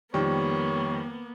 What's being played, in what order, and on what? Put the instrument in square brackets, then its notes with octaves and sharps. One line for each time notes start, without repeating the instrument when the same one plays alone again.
[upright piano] F2 D#3 G3 [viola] A#3 B3 [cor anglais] C#5